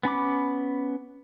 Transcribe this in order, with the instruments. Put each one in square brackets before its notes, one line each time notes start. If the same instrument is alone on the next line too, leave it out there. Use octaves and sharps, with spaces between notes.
[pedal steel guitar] B3 C#4 B5 D6